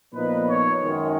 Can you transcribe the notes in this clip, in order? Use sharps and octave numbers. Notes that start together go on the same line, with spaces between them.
A#2 F3 B3 D#4 B4
C#5
F#2 D#3 G#3